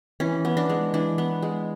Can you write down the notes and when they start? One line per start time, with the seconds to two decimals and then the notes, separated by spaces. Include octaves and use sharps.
0.20 E3 C#4
0.45 B3
0.57 D4
0.70 G#3
0.94 E3 D4
1.18 B3
1.42 G#3